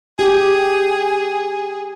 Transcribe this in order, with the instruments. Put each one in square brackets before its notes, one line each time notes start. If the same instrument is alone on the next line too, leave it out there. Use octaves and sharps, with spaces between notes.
[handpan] G4 [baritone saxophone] G#4